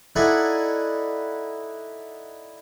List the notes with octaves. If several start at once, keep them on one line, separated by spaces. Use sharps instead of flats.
D#4 E4 A4 D5 F#5 G#5